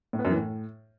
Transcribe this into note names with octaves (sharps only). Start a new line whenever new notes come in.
A2
B3
F#2
E3
A2